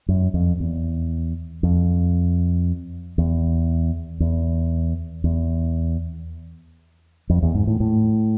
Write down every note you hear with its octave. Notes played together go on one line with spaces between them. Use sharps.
F#2
F2
E2
F2
E2
E2
E2
F2
E2
G#2
A2
A2